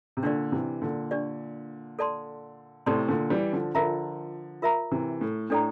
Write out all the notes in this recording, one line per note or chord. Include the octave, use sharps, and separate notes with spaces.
C3
A#2 D3 D4 G4 D5
C3 E3
A#2 D3
D4 G4 D5
A4 D5 A5 C6
A2 C3 A4 D5 A5 C6
A#2 D3
E3 G3
D3 F3
D3 F3 F4 A#4 E5 A#5
F4 A#4 E5 A#5
C3 E3
A2
A2 D4 A4 D5 G5 A#5